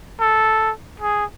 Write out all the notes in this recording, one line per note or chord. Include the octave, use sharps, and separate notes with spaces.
A4
G#4